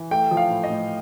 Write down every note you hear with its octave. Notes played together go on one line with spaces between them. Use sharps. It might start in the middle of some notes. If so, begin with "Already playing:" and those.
Already playing: E3
A3 G5
F3
F5
A2
D#5
A2